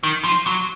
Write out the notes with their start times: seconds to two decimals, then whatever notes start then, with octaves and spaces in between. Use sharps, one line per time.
0.03 D#3
0.24 F3
0.47 F#3